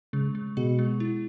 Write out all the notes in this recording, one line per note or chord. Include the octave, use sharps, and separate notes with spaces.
C#3 G#3
G#3
B2 G#4
G#3
E4